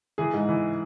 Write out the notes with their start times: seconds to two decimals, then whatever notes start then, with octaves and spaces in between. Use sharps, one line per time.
0.18 E3 G#4
0.34 G#2
0.49 E3